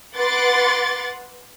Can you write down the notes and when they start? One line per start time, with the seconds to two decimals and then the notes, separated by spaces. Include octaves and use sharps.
0.16 B4 F#5 C6 D6 A6